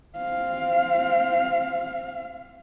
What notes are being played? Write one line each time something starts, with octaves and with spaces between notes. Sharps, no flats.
C4 F5